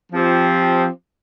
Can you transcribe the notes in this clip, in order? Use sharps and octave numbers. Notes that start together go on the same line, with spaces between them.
F3 C4 G4